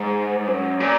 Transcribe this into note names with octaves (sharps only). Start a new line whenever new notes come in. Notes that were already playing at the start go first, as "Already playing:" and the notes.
Already playing: G#2
F#2
A#2